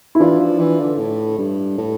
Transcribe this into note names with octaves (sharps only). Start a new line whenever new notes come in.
E4
E3 D4 F4
F3
E3
D3
A2
G2
A2